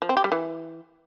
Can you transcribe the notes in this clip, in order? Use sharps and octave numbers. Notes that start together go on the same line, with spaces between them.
F3
C4
G4
G3
E3